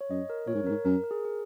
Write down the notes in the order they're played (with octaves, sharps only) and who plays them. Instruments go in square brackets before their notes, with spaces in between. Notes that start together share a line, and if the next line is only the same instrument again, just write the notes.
[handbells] C#5
[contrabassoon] F#2 [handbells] D#5
[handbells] A#4
[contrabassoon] A#2 [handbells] C#5
[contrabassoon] G#2
F#2
[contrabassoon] G#2 [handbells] A#4
[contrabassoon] F#2 [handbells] A#4
[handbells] A#4
G#4
G#4